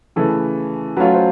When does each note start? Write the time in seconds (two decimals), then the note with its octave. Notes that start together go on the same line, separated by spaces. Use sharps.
0.16 C#3 E3 A3 A4
0.97 F#3 A3 C#4 F4 B4
1.14 C5